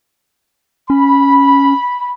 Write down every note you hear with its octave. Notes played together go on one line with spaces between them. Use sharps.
C#4 B5